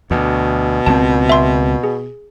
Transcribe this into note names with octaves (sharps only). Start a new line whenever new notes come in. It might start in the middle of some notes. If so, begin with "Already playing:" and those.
D2 B2
C#2 F3 C4 A5
E5 C6
G#4